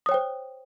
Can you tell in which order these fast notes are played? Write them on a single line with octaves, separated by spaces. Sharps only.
D#6 C#5 G5 C5